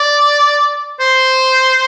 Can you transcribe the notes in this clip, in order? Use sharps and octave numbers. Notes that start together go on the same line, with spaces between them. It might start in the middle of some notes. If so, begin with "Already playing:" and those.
Already playing: D5
C5